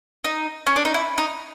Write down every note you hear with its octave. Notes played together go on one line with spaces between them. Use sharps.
D#4
C#4
D4
D#4
E4
D#4